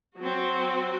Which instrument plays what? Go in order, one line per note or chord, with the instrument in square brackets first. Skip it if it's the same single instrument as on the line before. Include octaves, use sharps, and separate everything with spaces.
[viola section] F#3 C4 F#4